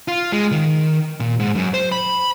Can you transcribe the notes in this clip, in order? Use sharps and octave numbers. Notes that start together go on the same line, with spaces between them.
F4
G#3
D#3
A#2
G#2
F#2
C5
B5